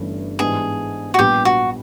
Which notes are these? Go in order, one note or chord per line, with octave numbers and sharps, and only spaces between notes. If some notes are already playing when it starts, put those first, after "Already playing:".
Already playing: G1 G2 E3 A3 C#4
G#2 E3 G3 B3 D4 G#4
F#4
A#1 A#2 G3 B3 G4
F#4